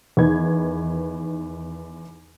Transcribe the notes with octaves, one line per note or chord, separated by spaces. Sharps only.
E2 D#3 D#4 B4 G#6